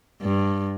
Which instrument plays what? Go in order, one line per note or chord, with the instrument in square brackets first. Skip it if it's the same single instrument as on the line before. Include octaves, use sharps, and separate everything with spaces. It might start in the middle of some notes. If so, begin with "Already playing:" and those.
[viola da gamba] G2